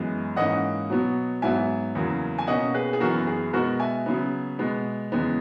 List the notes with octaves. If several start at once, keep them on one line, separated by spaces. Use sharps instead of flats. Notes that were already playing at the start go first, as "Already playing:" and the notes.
Already playing: F#2 E3 G#3 B3
G#2 E3 A#3 C#4 D#5 F#5
B2 F#3 B3
G#2 F#3 B3 E5 G#5
E2 C#3 F#3 A#3
G#5
B2 A#3 C#4 D#5 F#5
G#4 B4
G#4
F#2 E3 B3 F#4 A#4
G#4
B2 G#3 B3 F#4 A#4
E5 G#5
C#3 F#3 B3
B2 G#3 B3
E2 C#3 G#3 B3